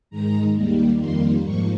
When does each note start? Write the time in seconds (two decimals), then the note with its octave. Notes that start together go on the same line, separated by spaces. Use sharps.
0.10 G#2 D#3 G#3 A#5
0.55 D#2 D#3 G3 A#3
0.99 F2 D#3 G3 A#3 C6
1.44 G#2 F3 A#3 C#6